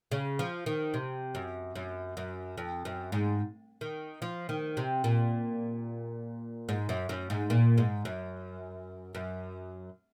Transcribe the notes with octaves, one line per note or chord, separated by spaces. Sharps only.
C#3
F3
D#3
C3
F#2
F#2
F#2
F2
F#2
G#2
D#3
F3
D#3
C3
A#2
G#2
F#2
F#2
G#2
A#2
G#2
F#2
F#2